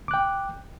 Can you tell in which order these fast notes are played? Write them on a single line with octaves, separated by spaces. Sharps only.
D6 F#6 G5